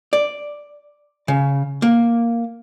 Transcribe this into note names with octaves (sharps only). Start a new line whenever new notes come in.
D5
C#3
A#3